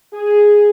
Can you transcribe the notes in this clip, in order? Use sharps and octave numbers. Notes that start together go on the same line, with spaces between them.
G#4